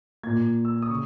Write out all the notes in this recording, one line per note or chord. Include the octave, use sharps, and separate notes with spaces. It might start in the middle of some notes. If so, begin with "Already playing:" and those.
A#2 A#3 G#6
E6
D#6
C#3 C#6